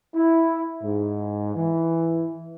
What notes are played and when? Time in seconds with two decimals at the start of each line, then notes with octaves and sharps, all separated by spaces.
0.15 E4
0.82 G#2
1.56 E3